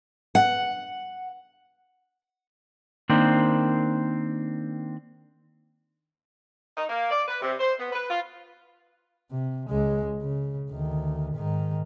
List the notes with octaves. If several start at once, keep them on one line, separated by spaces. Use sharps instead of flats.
F#5
D#3 A#3 C4 D4 C5
D#4
A#3
D5
B4
C3
C5
B3
B4
F4
C3
C#2 G#3
C#3
D2 D#3
G#2 D#3